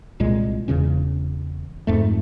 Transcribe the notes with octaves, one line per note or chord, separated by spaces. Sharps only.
C2 A#2 G#3
E1 E2 C#3 C#4
F2 G#2 A3